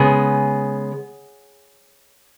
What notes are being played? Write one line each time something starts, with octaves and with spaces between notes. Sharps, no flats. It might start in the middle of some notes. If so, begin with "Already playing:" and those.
Already playing: C#3 G#3 B3 G#4